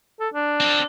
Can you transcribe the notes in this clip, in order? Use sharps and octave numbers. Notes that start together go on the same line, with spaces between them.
A4
D4
C4 A4